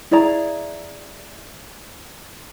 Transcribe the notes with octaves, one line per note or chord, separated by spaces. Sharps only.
E4 G#4 D5 A#5